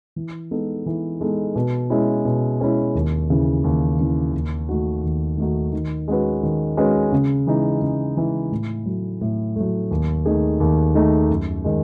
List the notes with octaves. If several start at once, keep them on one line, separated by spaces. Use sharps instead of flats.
E3
G#3 B3 D#4 A4
E3
G#3 B3 D#4 A4
B2
G#3 C#4 E4
B2
G#3 C#4 E4
D#2
C#3 E3
D#2
C#3 E3
D#2
D#3 A3 D#4 F#4
D#2
D#3 A3 D#4 F#4
D#3
G#3 C#4 F#4 B4
D#3
G#3 C#4 F#4 B4
C#3
E3 G#3 D#4
C#3
E3 G#3 D#4
A2
F#3 A3
A2
F#3 A3
D#2
D#3 A3 D#4 G#4
D#2
D#3 A3 D#4 G#4
F#2
D#3 G#3